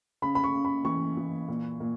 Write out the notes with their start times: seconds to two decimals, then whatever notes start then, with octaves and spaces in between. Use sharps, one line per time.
0.22 C#3 B5
0.35 B5
0.44 C#6
0.54 C#3
0.65 B5
0.85 E3 C#6
1.17 E3
1.48 A#2
1.80 A#2